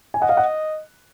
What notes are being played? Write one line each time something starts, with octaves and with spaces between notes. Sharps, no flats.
G#5
D#5 F#5
F5
F#5